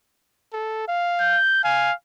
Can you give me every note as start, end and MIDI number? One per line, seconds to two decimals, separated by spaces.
0.53 0.83 69
0.88 1.38 77
1.21 1.61 91
1.64 1.93 77
1.64 1.91 80